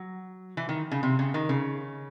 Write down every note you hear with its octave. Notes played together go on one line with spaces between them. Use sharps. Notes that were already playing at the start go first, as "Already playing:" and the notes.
Already playing: F#3
E3
D#3
C#3
C3
C#3
D#3
C#3